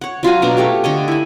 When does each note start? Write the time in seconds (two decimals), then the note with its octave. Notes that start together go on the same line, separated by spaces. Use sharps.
0.01 C#5 F#5
0.23 F#3 F4 F#4 G#5
0.42 B2 D4 A#5
0.57 A3 G4 C#5
0.84 D3 C#5 D#5
1.08 E4 G#5